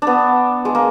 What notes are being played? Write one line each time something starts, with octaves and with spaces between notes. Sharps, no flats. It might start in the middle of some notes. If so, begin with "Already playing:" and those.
B3 D4
G#3
A#3